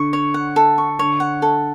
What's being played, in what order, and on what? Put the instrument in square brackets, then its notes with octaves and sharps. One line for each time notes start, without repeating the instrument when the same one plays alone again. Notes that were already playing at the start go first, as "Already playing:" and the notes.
Already playing: [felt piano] D3 [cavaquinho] C#6
[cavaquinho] C#5
F#5
A4
C#6
[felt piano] D3 [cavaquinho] C#5
[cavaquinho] F#5
A4